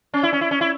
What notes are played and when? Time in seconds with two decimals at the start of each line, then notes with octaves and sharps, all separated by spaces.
0.14 C#4
0.23 E4
0.33 C#4
0.41 E4
0.51 C#4
0.61 E4